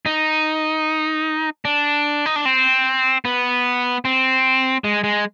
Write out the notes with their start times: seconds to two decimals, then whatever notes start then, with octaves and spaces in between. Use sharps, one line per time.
0.06 D#4
1.65 D4
2.26 D#4
2.36 D4
2.45 C4
3.25 B3
4.05 C4
4.84 G#3
5.04 G#3